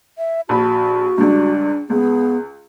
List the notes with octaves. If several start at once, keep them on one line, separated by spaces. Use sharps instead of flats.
E5
A#1 F#4 A5 B5
C#2 G2 D4
C#2 B3 G#4